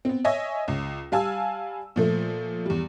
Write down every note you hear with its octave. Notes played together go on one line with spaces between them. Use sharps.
B3 C4
C#5 D#5 E5 G#5 A#6
C#2
G3 F5 G#5 A5 E6
A#2 F3 A3
E2 G3